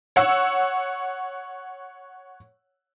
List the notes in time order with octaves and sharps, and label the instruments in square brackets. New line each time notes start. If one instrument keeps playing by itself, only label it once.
[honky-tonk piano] C#5 F#5 E6